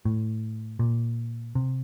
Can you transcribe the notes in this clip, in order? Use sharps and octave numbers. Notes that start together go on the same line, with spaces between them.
A2
A#2
C3